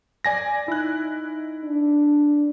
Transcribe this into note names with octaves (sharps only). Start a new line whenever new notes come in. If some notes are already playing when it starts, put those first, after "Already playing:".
D5 G#5 A#6
D#4 E4 F#6
D4